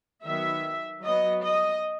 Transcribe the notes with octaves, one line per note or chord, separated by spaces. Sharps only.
D#3 F#3 B3 E5
F#3 B3 D#5
D#5